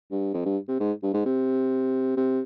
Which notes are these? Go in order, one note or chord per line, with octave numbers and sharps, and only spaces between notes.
G2
F2
G2
C3
G#2
G2
G#2
C3
C3